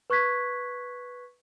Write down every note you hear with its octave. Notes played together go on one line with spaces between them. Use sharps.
B4 C#6 F#6 G#6 B6